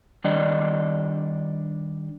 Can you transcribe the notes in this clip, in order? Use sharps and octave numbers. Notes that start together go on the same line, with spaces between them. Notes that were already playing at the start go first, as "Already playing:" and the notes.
D#3 G3 D4 D5 D#5